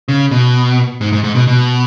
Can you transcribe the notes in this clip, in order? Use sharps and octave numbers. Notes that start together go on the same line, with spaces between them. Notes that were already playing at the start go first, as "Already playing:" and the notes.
C#3
B2
G#2
G#2
G#2
B2
B2